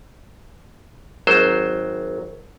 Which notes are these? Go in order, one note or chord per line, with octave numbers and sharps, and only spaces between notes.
G#1 F#3 C5